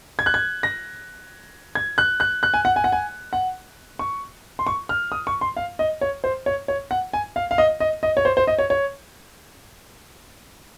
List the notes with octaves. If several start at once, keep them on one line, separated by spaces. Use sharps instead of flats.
G#6
F#6
G#6
A#6
G#6
F#6
F#6
F#6
G#5
F#5
G#5
F#5
G#5
F#5
C#6
C6
C#6
F6
D#6
C#6
C6
F5
D#5
C#5
C5
C#5
C#5
F#5
G#5
F5
F5
D#5
D#5
D#5
C#5
C5
C5
D#5
C#5
C#5